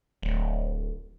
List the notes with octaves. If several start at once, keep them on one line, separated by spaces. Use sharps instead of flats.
D1